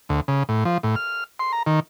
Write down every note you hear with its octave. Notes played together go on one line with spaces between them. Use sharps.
D2
C#3
A2
F3
A2
F6
C6
A#5
D#3